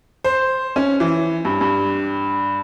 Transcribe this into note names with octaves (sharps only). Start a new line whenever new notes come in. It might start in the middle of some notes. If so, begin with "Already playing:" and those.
C5
C#4
E3
G2
G2